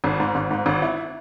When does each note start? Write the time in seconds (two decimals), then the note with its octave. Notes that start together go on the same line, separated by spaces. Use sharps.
0.04 G#1
0.20 G#2
0.35 G#1
0.51 G#2
0.66 G#1
0.82 E4